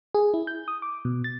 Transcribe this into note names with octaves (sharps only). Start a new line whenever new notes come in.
G#4
E4
G6
D#6
D6
B2
A6